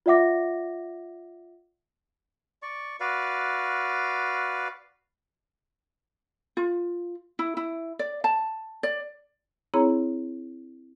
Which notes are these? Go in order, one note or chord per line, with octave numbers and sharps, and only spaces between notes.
F4 D5 E5 F#5 D6 A#6
D5 C#6
F#4 B4 D5 F5
F4
E4
E4
D5
A5
D5
C4 E4 G#4 C#5 A#5 B5